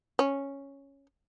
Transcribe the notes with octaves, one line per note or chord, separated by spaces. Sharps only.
C#4